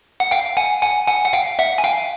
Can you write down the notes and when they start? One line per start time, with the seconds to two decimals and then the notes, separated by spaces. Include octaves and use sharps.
0.20 F#5
0.31 F5 G5
0.57 F#5 G#5
0.82 F#5 G#5
1.08 F#5 G#5
1.25 F#5
1.33 F5 G5
1.59 E5 F#5
1.78 G#5
1.84 F5 G5